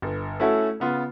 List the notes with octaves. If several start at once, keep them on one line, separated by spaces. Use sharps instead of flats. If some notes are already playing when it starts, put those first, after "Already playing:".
G1
A3 C#4 E4 F#4 A4
C#3 B3 F4